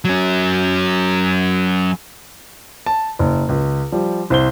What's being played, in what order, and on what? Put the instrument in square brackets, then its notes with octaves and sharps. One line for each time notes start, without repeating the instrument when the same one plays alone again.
[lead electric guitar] F#3 C#4
[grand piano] A5
F#1
C#2
F3 G3
C2 C5 G7